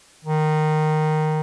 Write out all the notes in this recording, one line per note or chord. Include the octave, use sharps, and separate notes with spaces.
D#3